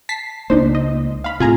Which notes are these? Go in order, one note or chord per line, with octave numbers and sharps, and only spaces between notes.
A5 B6 C7
C#2 A#3 D4 D#4 C5
D#5
F5 B5
A2 C3 F4 G#4 A#5